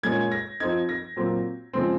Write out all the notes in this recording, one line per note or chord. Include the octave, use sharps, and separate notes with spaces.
A#2 G#3 C#4 G#6
A#6
F3 C4 D#4 G#6
A#6
A#2 F#3 C4
C#3 F3 G#3 C4